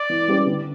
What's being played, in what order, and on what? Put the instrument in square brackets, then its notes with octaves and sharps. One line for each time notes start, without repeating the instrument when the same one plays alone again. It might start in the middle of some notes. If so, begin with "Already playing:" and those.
Already playing: [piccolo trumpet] D5
[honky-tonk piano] E3
G3 C#4 G4 B4
D3